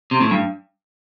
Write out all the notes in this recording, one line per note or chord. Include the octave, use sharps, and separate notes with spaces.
C3
A2
G2